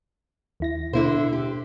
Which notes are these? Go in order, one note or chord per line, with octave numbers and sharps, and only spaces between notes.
D#2 E4 A#6
B2 D3 E4 C5
G4